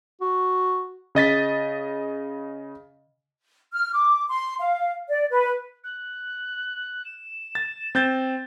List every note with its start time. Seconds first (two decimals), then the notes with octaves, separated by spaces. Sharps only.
0.21 F#4
1.15 C#3 D#5 A6 B6
3.73 F6
3.93 D6
4.28 C6
4.59 F5
5.08 D5
5.30 B4
5.83 F#6
7.05 E7
7.55 A6
7.95 C4 G6 A6